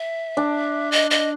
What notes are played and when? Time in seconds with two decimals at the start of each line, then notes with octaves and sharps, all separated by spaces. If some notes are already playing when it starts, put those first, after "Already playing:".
Already playing: E5
0.37 D4
0.92 D#5
1.11 D#5